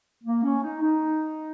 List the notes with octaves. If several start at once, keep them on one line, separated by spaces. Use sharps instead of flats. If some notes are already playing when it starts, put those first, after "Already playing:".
A#3
C#4
D#4
D#4